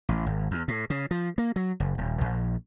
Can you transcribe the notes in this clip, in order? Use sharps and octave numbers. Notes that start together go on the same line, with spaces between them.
A1
G#1
E2
A2
C#3
F3
A#3
F#3
F#1
D#1
A#1